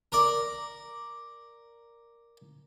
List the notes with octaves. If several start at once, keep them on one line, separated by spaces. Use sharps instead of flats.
A#4 D5